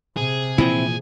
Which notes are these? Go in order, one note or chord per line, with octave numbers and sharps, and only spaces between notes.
C3 G#4
A#2 E3 F3 C4 E4